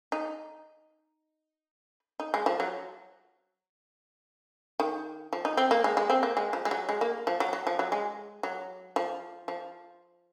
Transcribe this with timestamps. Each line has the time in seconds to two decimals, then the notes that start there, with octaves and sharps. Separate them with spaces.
0.12 D#4
2.20 D#4
2.34 G#3
2.46 F3
2.60 F#3
4.80 D#3
5.33 F3
5.45 D#4
5.57 C4
5.71 A#3
5.84 G#3
5.97 G#3
6.10 C4
6.23 A#3
6.37 G#3
6.53 F3
6.65 G#3
6.71 F#3
6.89 G#3
7.01 A#3
7.27 F3
7.40 F#3
7.53 F#3
7.67 F3
7.79 F#3
7.92 G#3
8.43 F#3
8.96 F3
9.48 F3